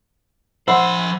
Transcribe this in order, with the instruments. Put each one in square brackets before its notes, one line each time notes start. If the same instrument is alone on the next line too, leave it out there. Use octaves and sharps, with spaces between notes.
[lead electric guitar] F3 B5 [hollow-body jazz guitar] C5 [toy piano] E5 F#5 E6